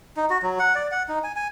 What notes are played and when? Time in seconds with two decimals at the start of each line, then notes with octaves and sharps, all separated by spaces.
0.17 D#4
0.30 F#4
0.42 F#3
0.59 F#5
0.75 D5
0.91 F#5
1.08 D#4
1.24 G#5
1.36 G#5